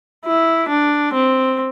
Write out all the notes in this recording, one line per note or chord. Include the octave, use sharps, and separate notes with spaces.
E4
D4
C4